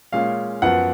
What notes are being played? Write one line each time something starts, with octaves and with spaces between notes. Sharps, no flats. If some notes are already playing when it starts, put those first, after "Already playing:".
A#2 G#3 C#4 F5
F#2 F3 B3 F#5